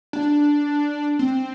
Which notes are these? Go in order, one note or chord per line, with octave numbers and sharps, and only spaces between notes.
D4
C4